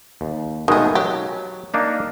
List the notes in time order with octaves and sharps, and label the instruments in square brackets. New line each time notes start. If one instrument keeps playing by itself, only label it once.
[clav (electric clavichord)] D#2
[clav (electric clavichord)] B2 G#3 A3 [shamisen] D#3 G#4
[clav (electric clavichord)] F#3 [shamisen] G4
[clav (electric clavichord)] A#3 D4 D#4